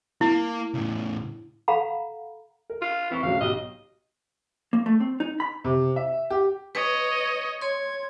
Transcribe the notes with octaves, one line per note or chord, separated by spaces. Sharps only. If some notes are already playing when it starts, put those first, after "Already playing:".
A#3 E4
A2 C#3
A4 F5 F#5 A#5 B5
A#4
F4
E3 C4 C#6
D2 C#3 F#3 F5
B1 G4 D#5
A#3
A3
C4
D#4
B5
C3
E5
G4
B4 C#5 D#5
C#5 C6 G#6